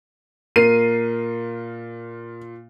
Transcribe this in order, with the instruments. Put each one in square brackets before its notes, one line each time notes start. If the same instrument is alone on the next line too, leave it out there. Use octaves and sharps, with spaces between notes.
[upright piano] A#2 C7 D#7 [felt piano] A#4